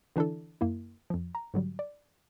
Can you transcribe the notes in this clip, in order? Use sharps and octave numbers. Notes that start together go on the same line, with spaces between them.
D3 E3 D4 E4 A4
F#2 A#3 E4
F2 F3
A#5
G#2 D3 F#3 G3
D5